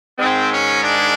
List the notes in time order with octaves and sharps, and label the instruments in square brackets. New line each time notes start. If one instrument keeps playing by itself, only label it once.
[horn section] G#2 D#3 G#3 C4
C#4
D4